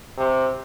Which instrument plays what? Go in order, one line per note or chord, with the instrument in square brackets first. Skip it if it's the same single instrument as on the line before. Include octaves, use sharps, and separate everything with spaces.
[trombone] C3